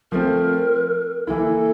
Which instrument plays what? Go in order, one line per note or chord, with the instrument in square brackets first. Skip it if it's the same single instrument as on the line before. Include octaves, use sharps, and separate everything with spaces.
[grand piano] F3 A3 C4 [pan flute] A#4
[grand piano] E3 A#3 E4 [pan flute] A4